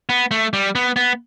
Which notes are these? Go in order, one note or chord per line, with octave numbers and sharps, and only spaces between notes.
B3
A3
G3
B3
B3